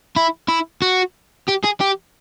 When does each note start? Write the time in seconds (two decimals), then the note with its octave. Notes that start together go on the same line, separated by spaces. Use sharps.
0.16 E4
0.49 E4
0.82 F#4
1.48 G4
1.64 G#4
1.80 G4